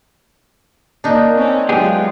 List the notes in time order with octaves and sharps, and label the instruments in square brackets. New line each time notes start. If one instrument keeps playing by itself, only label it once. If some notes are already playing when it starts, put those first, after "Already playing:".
[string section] A#3 [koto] D4 D#4
[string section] C4 C#4
[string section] F#3 G#3 F4 [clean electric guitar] B3 G4 G#4